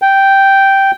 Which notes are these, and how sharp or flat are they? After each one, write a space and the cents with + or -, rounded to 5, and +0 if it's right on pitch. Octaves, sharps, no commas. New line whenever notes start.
G5 -5